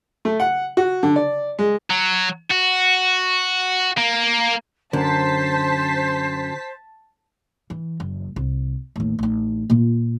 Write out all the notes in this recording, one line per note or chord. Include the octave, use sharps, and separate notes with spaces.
A3
F#5
F#4
D3
D5
G#3
F#3
F#4
A#3
F#2 D3 C5 A5 B6
E3
F#1
C2
A1 D#2
A1 D#4
A#2 F4